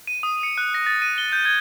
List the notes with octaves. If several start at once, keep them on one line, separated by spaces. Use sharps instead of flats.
D#7
D#6
C#7
F#6
A#6
A6
D#7
G7
G6
G#6